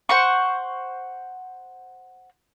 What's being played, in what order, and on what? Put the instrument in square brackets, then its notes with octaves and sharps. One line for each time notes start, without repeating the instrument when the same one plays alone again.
[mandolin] C5 F#5 C#6